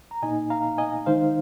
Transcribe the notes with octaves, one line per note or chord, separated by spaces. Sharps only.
A#5
A#2 A#3 D#4 D#5 G#5
F5 A#5
D#5 G#5
D#3 G#3 D#4 C5 F5